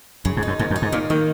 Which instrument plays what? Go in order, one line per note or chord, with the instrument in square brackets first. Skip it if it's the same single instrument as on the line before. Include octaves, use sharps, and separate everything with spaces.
[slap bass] F#2 [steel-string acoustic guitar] C#3
[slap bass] G#2
[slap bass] F#2 [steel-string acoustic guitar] D#4
[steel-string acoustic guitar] D#2 [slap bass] G#2
[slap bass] F#2
[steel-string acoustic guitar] D#4
[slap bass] G#2
[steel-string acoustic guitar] D#2 [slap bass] A#2
[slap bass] D#3 [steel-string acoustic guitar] A#3